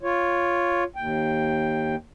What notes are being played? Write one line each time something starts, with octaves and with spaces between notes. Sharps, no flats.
F4 C#5
D#2 G5